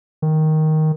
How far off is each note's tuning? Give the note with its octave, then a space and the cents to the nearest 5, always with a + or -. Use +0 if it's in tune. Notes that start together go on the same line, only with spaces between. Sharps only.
D#3 +5